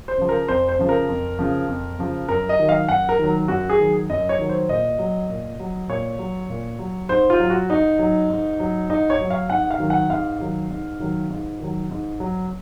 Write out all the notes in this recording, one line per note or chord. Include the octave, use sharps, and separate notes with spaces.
C5
C#3 F3
A#4
F2 C5
C5
C#3 F3
A#4
F2
C#3 F3
F2
C#3 F3
F#2 A#4
D#5
D#3 F#3
F5
F#2 F#5
A#4
D#3 F#3
F#2 F#4
G#4
D#3 F#3
F#2 D#5
C#5
D#3 F#3
C5
A#2 D#5
F#3
A#2
F#3
A#2 C#5
F#3
A#2
F#3
G#2 C5
F4
F#3
F#4
G#2 D#4
F#3
G#2
F#3
G#2 D#4
C#5
F#3
F5
G#2 F#5
F5
D#3 F#3
F#5
G#2 F5
D#3 F#3
G#2
D#3 F#3
G#2
D#3 F#3
G#2
F#3